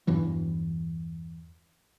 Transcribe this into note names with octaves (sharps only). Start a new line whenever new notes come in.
E2 G2 E3 F#3